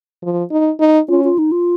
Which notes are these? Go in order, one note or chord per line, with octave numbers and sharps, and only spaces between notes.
F3
D#4
D#4
C#4 F4
F4
D#4
F4